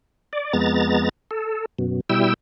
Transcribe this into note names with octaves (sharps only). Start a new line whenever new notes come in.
D5
F2 G#3 B3 A#5 A6
A4
F#2 B2
B2 G3 E4 G5 E6